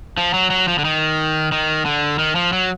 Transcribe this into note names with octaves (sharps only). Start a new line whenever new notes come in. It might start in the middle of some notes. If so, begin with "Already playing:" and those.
F3
F#3
F#3
F3
D3
D#3
D#3
D3
D#3
F3
F#3